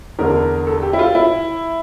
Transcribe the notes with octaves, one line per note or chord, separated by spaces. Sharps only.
E2 D3 A#4
A4
G4
E4
F4
E4